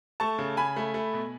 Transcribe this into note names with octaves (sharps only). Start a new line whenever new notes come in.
A3 A5 C#6
C#3
C#3 G#5 B5
A3
A3
B2